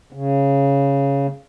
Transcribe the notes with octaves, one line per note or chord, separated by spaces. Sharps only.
C#3